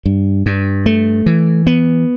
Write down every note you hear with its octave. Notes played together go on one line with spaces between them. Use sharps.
G2
G2
A3
E3
B3